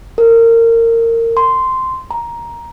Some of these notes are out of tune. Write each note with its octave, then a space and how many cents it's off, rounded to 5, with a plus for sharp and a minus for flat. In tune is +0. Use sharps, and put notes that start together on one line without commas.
A#4 -25
C6 -10
A#5 +10